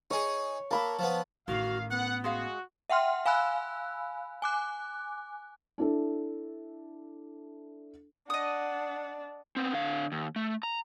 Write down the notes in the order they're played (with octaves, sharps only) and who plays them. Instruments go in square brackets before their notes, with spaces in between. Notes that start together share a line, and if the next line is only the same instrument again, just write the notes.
[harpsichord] D#4 G#4 [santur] C#5
[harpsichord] A#3 [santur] A5 B5 E6
[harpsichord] F3 B3
[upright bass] A1 [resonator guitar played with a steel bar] D#3 G3 [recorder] F#4 [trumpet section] F5
[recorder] B3 [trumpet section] F#5
[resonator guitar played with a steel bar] G#3 G#4 F5 [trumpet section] F#4
[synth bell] E5 F#5 G5 C6 F6
F5 G#5 B5 E6 F#6
G#5 D6 F#6
[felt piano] D4 E4 A4
[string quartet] D4 [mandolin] D#5 D#6 [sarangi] F#5
[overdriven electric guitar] B3 C4
D3 F5
D#2
A3
A#5